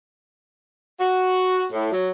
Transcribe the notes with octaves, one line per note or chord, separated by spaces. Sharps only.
F#4
A2
F#3